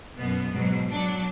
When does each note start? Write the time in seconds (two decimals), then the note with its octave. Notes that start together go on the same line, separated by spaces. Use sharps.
0.18 F#2 B2 B3
0.52 G#2 B2 F#3
0.88 F#3 D4